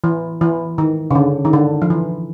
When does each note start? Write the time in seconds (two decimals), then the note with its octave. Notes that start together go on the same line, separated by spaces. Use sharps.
0.04 E3
0.41 E3
0.78 D#3
1.11 C#3
1.15 D3
1.45 D#3
1.53 D3
1.82 F3
1.90 E3